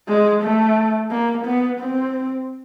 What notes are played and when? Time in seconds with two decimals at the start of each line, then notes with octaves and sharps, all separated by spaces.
0.09 G#3
0.43 A3
1.11 A#3
1.46 B3
1.79 C4